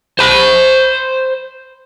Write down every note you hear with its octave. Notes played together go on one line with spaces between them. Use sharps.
C5 B5